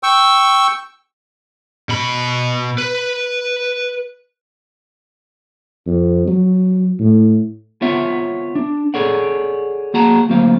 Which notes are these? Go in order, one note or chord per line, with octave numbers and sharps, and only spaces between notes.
G5 C#6 E6
B2 B5
B4
F2
F#3
A2
B3 C4 F4 C#5 E5 F#5
D4
G#4 A4 C#5 D5 F#5
A#3 F#4 G#4 F#5 A5 A#5
D2 F#3 A#3 C4 F5